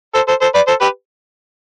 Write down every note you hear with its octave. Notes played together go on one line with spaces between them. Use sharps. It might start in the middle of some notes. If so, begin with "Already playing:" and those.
A4 C5
A4 C5
A4 C5
B4 D5
A4 C5
G4 B4